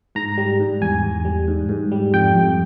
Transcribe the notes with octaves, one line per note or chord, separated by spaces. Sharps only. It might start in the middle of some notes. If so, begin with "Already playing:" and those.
G#2 A#5
G3
G#2
E2 G#5
E2
G3
G#2
G#2
G3
F2 G5
F2